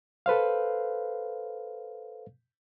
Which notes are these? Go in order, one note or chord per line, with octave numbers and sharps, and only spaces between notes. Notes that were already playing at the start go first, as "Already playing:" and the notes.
A4 B4 C5 F5